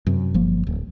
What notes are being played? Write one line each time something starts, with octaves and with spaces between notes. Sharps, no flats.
F#2 C3
G1 F3 A#3
D1